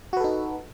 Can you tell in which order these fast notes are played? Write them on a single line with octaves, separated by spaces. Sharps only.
F#4 B4 A4 D#4